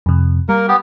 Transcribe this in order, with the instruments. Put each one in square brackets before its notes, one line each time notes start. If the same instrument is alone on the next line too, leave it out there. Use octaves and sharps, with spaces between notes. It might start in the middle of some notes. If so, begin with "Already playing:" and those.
[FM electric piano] F2 C3
[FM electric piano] G3 [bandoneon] A#3 A#4
[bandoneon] B3 G4